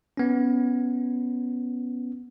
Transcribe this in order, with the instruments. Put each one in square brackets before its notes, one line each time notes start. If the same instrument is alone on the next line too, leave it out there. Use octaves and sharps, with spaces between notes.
[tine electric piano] B3 C#4